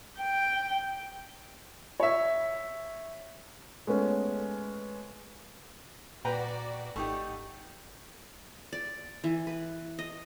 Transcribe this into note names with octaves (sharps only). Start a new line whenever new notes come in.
G5
C#5 E5
G#3 A3 B3 C#4
A#2 F#4 B4 D5 G5 A#5
G#1 A3 D#4 G4 F#5
D5
E3
B4
D#5